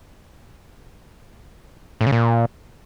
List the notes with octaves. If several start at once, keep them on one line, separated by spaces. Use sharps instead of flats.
A2
C#3
A#2